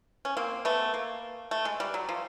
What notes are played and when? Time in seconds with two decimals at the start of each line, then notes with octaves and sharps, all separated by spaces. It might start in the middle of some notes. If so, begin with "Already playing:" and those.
0.25 C#4
0.37 A#3 C4
0.65 A3 B3
0.94 A#3
1.51 A3
1.65 G#3
1.80 G3
1.94 F#3
2.09 F3